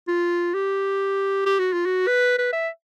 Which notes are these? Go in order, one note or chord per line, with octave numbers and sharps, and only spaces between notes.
F4
G4
G4
F#4
F4
F#4
B4
B4
E5